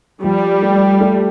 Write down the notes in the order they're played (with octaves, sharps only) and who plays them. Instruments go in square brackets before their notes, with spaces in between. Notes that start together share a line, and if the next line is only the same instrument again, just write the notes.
[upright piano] F3 [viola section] G3
[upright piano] A3
A3